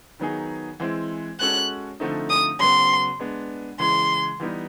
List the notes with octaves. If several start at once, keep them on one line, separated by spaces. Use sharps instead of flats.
D#3 F#3 B3 D#4 G#4
E3 G#3 C4 E4
G#3 C#4 F#4 A4 F#6
D3 F3 A3 C4 D#4
D#6
C#3 F#3 B3 C6
G#3 B3 D4
C#3 E3 G#3 C6
E3 G3 B3 D#4